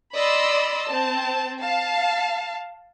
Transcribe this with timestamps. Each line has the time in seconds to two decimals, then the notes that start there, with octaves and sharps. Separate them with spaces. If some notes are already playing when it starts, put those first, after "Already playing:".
0.13 D5 D#5 B5 C6 E6
0.88 C4 A5
1.61 F5 A5